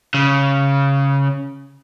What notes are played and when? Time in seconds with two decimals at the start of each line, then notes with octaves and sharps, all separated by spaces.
0.14 C#3